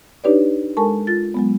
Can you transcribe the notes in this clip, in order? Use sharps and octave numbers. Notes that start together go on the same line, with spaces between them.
D4 D#4 G4 B4 C#5 D5
G#3 A4 A#4 G#5 A5 C#6
F4 A6
F#3 G#3 B3